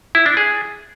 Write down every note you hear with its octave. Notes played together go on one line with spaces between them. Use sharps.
E4
D4
G#4